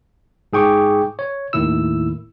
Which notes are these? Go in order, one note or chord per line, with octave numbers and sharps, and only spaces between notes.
G#2 G#4 G5 C#6 D6
C#5
D#2 A2 D#3 E4 E6